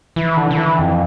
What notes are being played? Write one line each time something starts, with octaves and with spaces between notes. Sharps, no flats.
E3
D3
D3
E3
F2